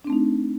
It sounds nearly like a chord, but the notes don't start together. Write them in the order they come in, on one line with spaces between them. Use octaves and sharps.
D4 C4 A3 D#4